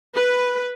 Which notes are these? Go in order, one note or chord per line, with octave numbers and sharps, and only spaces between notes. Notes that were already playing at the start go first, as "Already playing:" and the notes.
B4